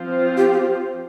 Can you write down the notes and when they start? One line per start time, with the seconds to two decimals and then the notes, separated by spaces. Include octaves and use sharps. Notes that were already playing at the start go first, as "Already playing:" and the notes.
Already playing: F3 C4 F4 C5
0.37 G4
0.53 G4